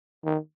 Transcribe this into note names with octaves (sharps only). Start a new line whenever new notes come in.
D#3